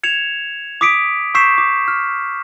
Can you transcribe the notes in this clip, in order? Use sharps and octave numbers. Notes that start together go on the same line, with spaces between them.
G#6 C#7 E7 F7
D6 D#6 B6 C#7 D7
C#6 E6 G6 B6 C7 E7
D6
F6